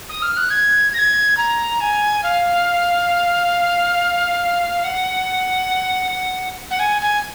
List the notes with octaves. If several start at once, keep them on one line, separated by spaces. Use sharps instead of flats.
D#6
F6
F#6
G#6
A#6
G#6
A#5
G#5
F5
F#5
F#5
G#5
G#5